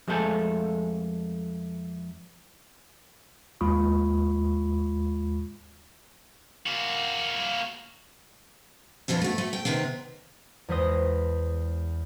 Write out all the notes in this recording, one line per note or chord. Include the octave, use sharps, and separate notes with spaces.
F2 G#3 A3 A4 C5 G#5
D#2 G#3 F4 B5 C#6 D#6
A#3 F#4
F2 B2 E3 F3 D4
A3 F#4
A3
G5
C3 D#3 B3 C4
E2 G#3 B4 C5 D#6 A#6